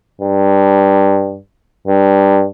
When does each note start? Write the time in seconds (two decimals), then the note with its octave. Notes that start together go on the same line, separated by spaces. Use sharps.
0.21 G2
1.87 G2